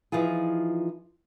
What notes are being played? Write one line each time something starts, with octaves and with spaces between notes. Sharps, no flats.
E3 F3 D#4 F4 G#4